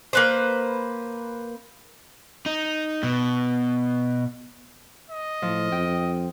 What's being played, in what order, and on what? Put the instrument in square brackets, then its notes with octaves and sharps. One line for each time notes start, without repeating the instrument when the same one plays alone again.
[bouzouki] A#3 B4 C5
[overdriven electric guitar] D#4
B2
[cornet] D#5
[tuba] A2 [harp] F3
[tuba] F2 [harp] G5